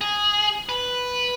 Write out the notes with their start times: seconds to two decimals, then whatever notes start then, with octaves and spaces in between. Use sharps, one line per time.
0.01 G#4
0.69 B4